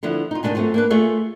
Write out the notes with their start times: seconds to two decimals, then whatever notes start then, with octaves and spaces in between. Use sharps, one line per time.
0.03 D3 F3 B3 E4
0.31 D#4 F4
0.43 D2 D#3 F3 A3 D4 G#5
0.55 F#3 A3 C4 C#4 F4
0.74 A#3 D4 B4
0.90 A3 F4 G#4 C#5 E5